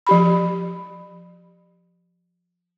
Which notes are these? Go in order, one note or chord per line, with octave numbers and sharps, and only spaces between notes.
F3 G4 B5